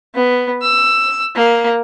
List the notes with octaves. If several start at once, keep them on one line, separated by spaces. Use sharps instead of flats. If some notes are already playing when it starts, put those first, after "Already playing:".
B3
E6
A#3